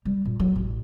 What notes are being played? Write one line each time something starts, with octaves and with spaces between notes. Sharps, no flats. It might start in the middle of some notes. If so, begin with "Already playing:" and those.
G3
A#2
F#3
A1